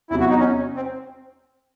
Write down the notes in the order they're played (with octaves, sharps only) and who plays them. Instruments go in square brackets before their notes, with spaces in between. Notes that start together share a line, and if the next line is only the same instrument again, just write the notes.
[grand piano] E2 C3 F#3 [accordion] E4
[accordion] F#4
D#4
C#4
C4